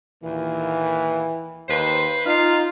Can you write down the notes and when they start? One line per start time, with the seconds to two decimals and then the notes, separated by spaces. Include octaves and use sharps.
0.23 D#2 A#2 E3
1.68 D#2 B4 C5
2.26 D#4 F4 F5